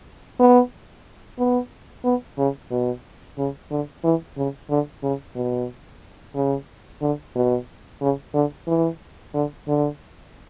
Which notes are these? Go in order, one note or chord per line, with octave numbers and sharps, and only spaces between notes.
B3
B3
B3
C#3
B2
C#3
D3
E3
C#3
D3
C#3
B2
C#3
D3
B2
C#3
D3
E3
D3
D3